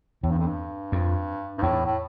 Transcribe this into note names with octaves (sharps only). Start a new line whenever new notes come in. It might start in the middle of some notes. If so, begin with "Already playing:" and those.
E2 A2
G2
F2
G2
F2
G2
E2 A2
A2